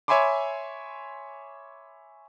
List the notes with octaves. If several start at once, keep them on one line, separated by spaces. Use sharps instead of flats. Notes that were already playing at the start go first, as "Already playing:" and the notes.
C#5 E5 G#5 B5 C6 D6